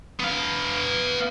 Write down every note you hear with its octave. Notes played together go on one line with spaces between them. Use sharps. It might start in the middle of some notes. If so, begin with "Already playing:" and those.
B3 F5